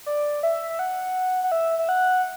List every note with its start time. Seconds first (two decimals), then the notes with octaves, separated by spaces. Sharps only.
0.06 D5
0.43 E5
0.70 E5
0.79 F#5
1.44 F#5
1.52 E5
1.79 E5
1.89 F#5